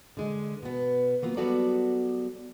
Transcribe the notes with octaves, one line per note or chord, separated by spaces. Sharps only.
D3 G#3
B2 B3
F#3 A#3 B3 F4
F#3 G3 B3 F#4 A4 D5